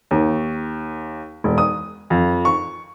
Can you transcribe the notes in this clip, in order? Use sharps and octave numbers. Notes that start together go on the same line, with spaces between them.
D#2
E1
D#6
F2
C#6